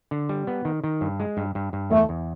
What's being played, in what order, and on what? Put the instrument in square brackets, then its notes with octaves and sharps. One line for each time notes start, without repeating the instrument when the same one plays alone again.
[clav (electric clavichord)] D3
G3
B3
D#3
D#3
G2
G#3
G2
G2
G2
[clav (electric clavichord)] E2 [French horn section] A3
[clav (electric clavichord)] E2